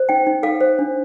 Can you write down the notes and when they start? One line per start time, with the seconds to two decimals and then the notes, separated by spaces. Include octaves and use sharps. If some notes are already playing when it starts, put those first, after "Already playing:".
Already playing: C5
0.09 D#4 G5
0.27 D#4
0.43 A4 F5
0.60 C5
0.79 D4